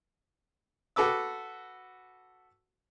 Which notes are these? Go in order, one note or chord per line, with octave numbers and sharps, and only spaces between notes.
F#4 A4 B4 D6 E6